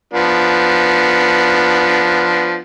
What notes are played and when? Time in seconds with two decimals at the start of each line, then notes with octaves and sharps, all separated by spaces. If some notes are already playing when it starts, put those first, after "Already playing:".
0.13 F3 B3 D4